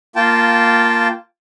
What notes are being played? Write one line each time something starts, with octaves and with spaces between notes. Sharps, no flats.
A#3 F4 G5 A5